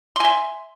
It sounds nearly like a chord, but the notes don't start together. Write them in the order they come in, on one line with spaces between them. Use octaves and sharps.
C6 G#5 E5